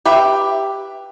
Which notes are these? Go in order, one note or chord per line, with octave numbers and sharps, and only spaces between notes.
G4 B4 E5